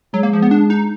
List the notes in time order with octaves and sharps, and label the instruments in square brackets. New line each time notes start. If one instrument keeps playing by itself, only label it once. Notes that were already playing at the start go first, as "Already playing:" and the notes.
[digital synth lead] F#3 [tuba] G#3
[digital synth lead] A#3
F3
B3
D4
D#4